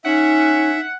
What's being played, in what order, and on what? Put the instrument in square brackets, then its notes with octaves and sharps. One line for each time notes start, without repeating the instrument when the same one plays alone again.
[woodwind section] C#4 [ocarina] D#4 [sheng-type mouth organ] E5 [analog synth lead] F#5